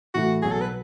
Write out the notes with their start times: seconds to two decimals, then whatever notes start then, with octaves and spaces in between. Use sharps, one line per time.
0.14 A2 E3 A3 F#4
0.42 B1 B2 F#3 G#4
0.52 A4
0.61 B4